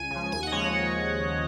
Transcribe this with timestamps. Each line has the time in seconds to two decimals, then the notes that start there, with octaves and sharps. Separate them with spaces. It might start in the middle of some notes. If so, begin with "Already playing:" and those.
Already playing: C#2 G#5
0.11 C#3 F3
0.32 D#2 G#5
0.43 F#5
0.47 D#5
0.52 C#3 F3 G#3 C#5